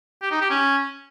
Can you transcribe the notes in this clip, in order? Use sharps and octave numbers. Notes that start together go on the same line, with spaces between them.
G4
D#4
G4
C#4